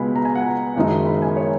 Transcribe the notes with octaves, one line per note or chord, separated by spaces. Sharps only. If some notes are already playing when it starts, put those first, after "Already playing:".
Already playing: C#2 B2 G#3 B3 G#5 B5
A#5
G#5
F#5 G#5
A#5
F#1 F#2 D#3 G#3 D#4
B5
G#5
C#5